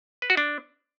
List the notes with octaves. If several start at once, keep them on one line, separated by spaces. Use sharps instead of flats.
B4
F#4
D4